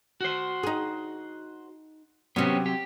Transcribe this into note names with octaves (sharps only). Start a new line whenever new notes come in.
F#4 C5
D#4 G#4
C3 F#3 B3 C#4 G4
G4